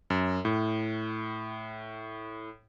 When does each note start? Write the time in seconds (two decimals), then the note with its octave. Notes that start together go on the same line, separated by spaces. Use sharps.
0.10 F#2
0.45 A2